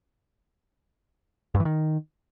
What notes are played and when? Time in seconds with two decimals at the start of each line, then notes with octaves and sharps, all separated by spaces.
1.55 G2
1.60 E3
1.65 D#3